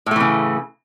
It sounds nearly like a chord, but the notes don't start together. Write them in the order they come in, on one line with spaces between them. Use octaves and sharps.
A2 A3 E3 C#3